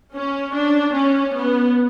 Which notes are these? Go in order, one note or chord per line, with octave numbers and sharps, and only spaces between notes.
C#4
D4
C#4
B3